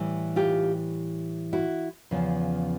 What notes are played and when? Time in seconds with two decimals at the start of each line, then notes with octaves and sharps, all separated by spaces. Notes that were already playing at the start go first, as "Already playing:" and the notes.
Already playing: A2 E3 G3
0.36 F4 G4
1.53 E4 F#4
2.11 E2 C#3 F3